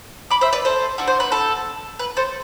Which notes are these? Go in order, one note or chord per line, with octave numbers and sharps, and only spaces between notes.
B5 D6
C5 E5
B4 D5
A4 C5
D4 F#4 A4
C5
B4
A4
B4
A4 C5